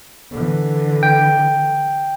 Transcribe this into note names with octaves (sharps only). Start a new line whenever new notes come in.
D3 E3
G5